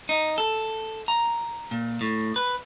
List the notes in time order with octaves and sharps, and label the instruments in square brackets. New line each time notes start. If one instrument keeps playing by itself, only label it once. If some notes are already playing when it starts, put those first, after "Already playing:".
[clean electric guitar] D#4
A4
A#5
A#2
A2
B4